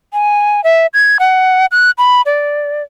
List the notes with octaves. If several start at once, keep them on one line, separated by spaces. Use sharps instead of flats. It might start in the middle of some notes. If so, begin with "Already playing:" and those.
G#5
E5
G#6
F#5
F#6
B5
D5